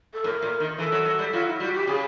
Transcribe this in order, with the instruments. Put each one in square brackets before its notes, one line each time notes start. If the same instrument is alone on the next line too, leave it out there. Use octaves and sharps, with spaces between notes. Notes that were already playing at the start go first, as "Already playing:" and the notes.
[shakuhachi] A4
[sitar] A2 [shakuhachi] A#4
[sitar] A#2
D#3
[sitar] E3 [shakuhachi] A4
[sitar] F#3
F#3
G3
[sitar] F#3 [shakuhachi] F4
[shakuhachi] E4
[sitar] G3 [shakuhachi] F#4
[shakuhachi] G4
[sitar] C#3 [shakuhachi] G#4